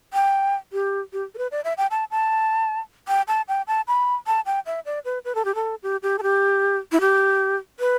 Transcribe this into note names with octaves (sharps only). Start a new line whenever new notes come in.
G5
G4
G4
A4
B4
D5
E5
G5
A5
A5
G5
A5
G5
A5
B5
A5
G5
E5
D5
B4
B4
A4
G4
A4
G4
G4
A4
G4
E4
G4
B4